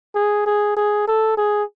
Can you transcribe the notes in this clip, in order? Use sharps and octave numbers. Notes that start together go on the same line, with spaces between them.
G#4
G#4
G#4
A4
G#4